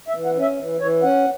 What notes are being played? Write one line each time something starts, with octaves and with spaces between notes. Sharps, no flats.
E5
E3
F#5
C#4
E5
E3
E3 C#5
C#4 F#5